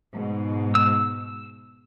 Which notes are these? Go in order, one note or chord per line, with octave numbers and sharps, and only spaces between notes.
G#2 B2
E6